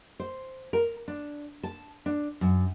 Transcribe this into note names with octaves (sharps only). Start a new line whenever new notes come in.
C5
A#4
D4
A5
D4
F#2